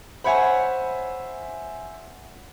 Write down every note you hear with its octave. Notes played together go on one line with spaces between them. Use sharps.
C5 C#5 E5 F#5 G#5 B5